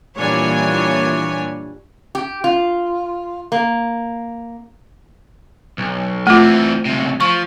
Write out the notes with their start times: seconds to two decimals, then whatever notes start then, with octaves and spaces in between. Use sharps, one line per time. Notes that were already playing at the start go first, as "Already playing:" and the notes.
0.17 A#2 E3 G3 D4 C#5 G#5
2.15 G4
2.44 F4
3.52 A#3
5.78 B1
6.27 E3 A3 C4 F4
6.85 C#2 C3
7.21 F3 C#6